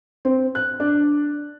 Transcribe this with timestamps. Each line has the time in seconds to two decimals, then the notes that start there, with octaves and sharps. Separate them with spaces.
0.25 C4
0.55 F#6
0.80 D4